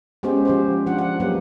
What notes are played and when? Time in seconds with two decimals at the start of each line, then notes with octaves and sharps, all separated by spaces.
0.23 G#3 B3 C#4 F#4 G4 C5
0.45 F3 G4 C5
0.86 F3 D4 F4 F#5
0.99 F#5
1.20 F#3 G#3 A#3 G4 B4